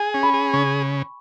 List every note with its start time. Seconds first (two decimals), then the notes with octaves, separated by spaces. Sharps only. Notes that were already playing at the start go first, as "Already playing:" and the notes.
Already playing: G#4 G#5
0.14 C#4
0.23 B5
0.34 G#4
0.53 C#3 C#6